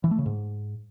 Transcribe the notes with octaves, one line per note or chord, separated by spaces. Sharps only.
E3
A3
C#3
G#2